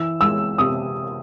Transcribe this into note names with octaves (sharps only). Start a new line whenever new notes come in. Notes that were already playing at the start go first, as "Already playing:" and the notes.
Already playing: E3 E6
G#3 E6
C3 D#6